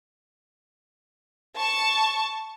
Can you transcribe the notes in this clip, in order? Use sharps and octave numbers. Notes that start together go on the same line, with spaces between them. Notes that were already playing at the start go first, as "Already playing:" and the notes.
A5 C#6